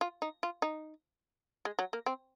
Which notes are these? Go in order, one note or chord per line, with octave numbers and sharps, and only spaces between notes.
F4
D#4
F4
D#4
G#3
F#3
A#3
C4